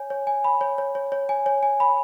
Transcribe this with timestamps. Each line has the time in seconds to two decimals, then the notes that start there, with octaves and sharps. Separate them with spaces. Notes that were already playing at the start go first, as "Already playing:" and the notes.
Already playing: C#5 G#5
0.10 C#5
0.27 G#5
0.44 B5
0.61 C#5
0.78 C#5
0.95 C#5
1.12 C#5
1.29 G#5
1.46 C#5
1.63 G#5
1.80 B5